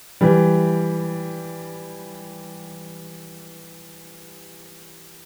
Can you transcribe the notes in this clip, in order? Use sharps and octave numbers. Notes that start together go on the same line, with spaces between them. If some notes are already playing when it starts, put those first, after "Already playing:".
E3 G3